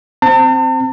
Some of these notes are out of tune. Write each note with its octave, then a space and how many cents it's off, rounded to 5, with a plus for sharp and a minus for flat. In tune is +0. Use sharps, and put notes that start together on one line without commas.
C4 +0 A5 +45